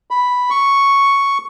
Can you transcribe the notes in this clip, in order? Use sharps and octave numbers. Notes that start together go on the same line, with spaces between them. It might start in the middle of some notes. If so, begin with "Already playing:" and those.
B5
C#6